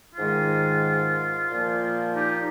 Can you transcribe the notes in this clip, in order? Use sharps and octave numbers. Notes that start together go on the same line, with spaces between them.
G#2 D#3 G#3 F4
A#2 F3 A#3
D#4 G4